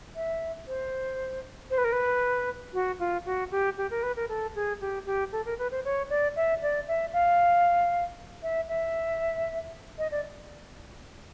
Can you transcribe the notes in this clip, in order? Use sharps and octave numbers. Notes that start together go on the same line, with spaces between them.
E5
C5
C5
B4
A#4
B4
F#4
F4
F#4
G4
G4
A#4
B4
A#4
A4
G#4
G4
G4
A4
A#4
B4
C5
C#5
D5
E5
D5
E5
F5
E5
E5
D#5
D5